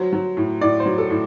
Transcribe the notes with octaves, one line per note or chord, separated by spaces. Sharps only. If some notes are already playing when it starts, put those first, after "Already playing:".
Already playing: F#3 C5
F#3
A2
A2 D5
C5
F#3
A4
A2